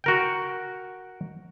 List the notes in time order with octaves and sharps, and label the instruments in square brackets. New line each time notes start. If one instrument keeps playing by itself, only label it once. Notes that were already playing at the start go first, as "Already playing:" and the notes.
[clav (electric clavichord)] F#4 A#4 G5